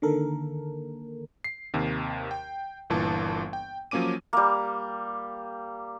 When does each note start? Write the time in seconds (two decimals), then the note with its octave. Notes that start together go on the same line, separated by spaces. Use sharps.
0.02 D3 D#3 A#3 A4 A#4
1.44 C7
1.73 D#2 C3 D#3
2.31 G5
2.90 G1 A#2 E3 A5
3.53 G5
3.91 F3 F#3 A#3 C#4 D6 D#7
4.33 G3 A#3